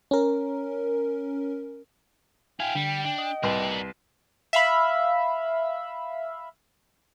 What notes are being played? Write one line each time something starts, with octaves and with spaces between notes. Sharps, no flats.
C#4 A#4
E4 F5 G5 G#5
D3 G3
D4
D#5
C2 A#4 B4 D5 C6
E5 F5 B5